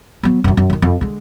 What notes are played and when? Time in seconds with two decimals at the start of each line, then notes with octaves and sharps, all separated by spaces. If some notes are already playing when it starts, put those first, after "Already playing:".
0.23 F#3 B3
0.44 F#2 D#3
0.57 F#2
0.70 D3 D#3
0.82 F2
1.01 D3 G#3